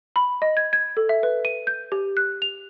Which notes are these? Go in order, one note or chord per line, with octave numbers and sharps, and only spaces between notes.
B5
D#5
G#6
G#6
A4
E5
B4
D#7
G6
G4
F#6
F7